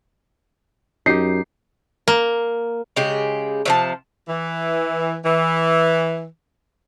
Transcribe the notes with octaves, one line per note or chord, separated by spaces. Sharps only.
F#2 D#4 G4 C7
A#3
C#3 G#3 G4
C3 F3 A5
E3
E3